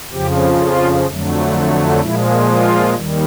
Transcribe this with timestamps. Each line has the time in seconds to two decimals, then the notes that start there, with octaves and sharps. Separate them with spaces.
0.12 F2 C#3 F3 G4
0.59 F4
1.06 F2 D3 F#3 A3
2.01 A#2 F3 G#3 E4
2.47 F4
2.94 D#2 D#3 G3